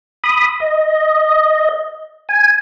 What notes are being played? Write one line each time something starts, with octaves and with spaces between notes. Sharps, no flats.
B5 D#6
D#5
G#5